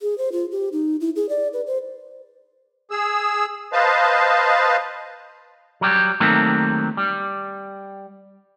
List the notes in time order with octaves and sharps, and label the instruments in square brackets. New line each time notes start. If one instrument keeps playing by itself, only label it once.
[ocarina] G#4
C5
F4
G4
D#4
E4
G#4
D5
B4
C5
[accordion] G#4 E6
B4 C5 D#5 F5 A5
[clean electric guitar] F#3 G3 G4
D#3 F#3 G3 A3 A#3 C4
G3